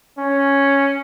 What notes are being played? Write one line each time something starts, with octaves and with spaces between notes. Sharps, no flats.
C#4